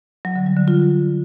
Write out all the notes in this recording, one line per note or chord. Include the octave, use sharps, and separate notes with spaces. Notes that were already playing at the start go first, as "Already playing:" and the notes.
F#3
D3
G3
D3
F4